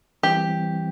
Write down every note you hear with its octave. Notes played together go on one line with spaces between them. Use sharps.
E3 G3 C4 G4